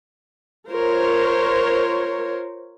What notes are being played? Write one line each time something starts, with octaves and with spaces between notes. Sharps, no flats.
F4 A#4 C5 C#5